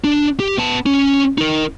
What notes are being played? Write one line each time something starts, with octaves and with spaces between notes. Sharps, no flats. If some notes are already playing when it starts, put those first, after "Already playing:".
D4
G4
B3 A5
C#4
D#4 A#4